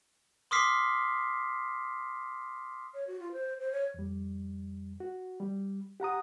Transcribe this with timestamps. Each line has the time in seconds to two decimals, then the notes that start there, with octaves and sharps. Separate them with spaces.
0.51 C6 D6 D#6 F6 B6 C7
2.94 C#5
3.07 F#4
3.20 F4
3.32 C5
3.60 C5
3.72 C#5
3.94 F2 G3
5.00 F#4
5.40 G3
6.00 G4 F#5 A#5 D#6